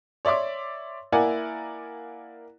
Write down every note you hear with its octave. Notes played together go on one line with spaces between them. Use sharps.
C#5 D5 E5 C6 D6
A#3 E4 A#4 D5 F#5 G#5